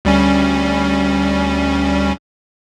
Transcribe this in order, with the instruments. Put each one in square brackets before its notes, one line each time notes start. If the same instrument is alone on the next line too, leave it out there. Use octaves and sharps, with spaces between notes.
[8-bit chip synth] D2 G3 C#4